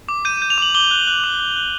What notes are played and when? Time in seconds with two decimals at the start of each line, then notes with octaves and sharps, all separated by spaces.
0.09 D6
0.25 G6 D#7
0.37 D#7
0.42 G6
0.50 F7
0.58 D6 F#7
0.75 D6 G7
0.91 F#6
1.07 F#6
1.24 D6
1.40 D6
1.56 F#6